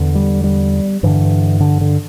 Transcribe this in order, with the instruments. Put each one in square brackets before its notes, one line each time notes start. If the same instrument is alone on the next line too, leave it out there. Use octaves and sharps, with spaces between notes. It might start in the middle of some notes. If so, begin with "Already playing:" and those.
Already playing: [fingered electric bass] E2 D3
G3
G3
G2 D3 E3
D3
D3